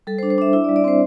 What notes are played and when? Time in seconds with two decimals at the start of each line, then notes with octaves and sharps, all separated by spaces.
0.07 G3 A4
0.18 C5
0.23 D4
0.30 C5
0.38 D4 E5
0.53 E4 E5
0.64 D5
0.69 G3
0.76 D5
0.84 C4 C5